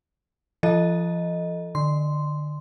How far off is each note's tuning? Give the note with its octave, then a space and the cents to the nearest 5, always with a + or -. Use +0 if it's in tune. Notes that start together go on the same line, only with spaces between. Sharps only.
F3 -35 A4 +0 D#5 +0
D3 +25 C6 -10